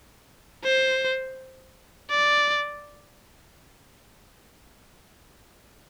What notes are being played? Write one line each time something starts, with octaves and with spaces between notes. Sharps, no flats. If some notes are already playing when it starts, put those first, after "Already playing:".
C5
D5